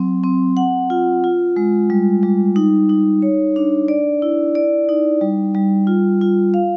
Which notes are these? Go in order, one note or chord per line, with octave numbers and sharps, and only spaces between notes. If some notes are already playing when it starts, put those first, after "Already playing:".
Already playing: F#3 C4
C4
F#5
F4
F4
G#3
G3
G3
D#4
D#4
C#5
D4
D5
E4
D5
D#4
G3
G3
F4
F4
F5